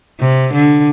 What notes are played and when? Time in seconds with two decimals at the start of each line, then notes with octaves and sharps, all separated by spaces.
0.20 C3
0.54 D3